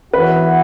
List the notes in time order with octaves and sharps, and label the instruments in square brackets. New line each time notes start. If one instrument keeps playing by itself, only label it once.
[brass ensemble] E3 B3 F#4 [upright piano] B4